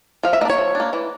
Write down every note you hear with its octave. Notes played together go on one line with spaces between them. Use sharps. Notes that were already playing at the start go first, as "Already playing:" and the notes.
F3 F5
E5
A#3 D4 D#5
C#5
F3
D4
A#3
E3